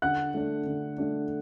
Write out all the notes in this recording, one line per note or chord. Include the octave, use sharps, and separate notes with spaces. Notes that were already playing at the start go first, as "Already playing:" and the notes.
D3 F#5 F#6
A3 D4
D3
A3 D4